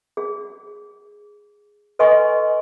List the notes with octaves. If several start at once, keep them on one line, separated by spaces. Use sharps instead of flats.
G#4
A4 B4 D#5 G#5 C6 C#6